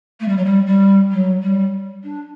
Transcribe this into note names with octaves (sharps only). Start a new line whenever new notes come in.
A3
G3
F#3
G3
G3
F#3
G3
D4